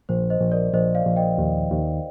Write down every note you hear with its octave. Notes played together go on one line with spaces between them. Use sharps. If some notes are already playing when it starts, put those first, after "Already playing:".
A#1 C5
C5 D#5
A#1
A#4 D5
A#1 C5 D#5
D5 F5
A#1
D#5 G5
D#2
D#2